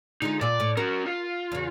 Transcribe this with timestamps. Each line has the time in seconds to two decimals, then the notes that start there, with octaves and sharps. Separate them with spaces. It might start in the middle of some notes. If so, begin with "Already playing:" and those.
0.22 D3 G#3 D#4 F4
0.41 A#2 F4 D5
0.60 A2
0.77 C#4 F#4 A#4
1.06 F4
1.52 E2 C#3